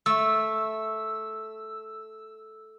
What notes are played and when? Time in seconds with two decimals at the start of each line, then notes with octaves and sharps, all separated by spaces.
0.06 A3 E6